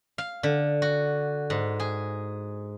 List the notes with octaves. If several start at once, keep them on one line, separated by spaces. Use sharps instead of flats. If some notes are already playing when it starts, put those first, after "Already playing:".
F5
D3
F#4
G#2
G#4